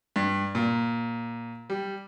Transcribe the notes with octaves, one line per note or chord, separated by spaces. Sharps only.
G2
A#2
G3